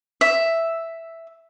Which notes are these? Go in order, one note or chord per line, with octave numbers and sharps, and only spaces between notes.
E5